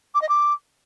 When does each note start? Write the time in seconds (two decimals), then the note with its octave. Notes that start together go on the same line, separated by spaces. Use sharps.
0.14 D6
0.21 D#5
0.29 D6